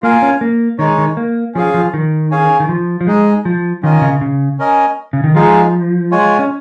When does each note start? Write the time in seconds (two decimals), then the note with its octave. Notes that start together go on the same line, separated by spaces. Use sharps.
0.02 A#3 F4 A#4 F5 G#5
0.22 C#4
0.41 A#3
0.79 D#3 G#3 D#4 C#5
0.98 D#3
1.17 A#3
1.54 F3 C#4 G#4 F5
1.74 F3
1.94 D#3
2.31 C#4 G#4 C#5 F5 G#5
2.60 D#3
2.69 F3
3.01 F3
3.07 G#3 D#4 G#4 D#5 G#5
3.45 F3
3.83 D#3 C#4 F4 A#4 D#5 G#5
4.02 C#3
4.21 C#3
4.59 C#4 A#4 D#5 G#5
5.13 C#3
5.24 D#3
5.35 F3 G#3 D#4 G#4 F5
6.11 G#3 F4 C#5 G#5
6.39 C#4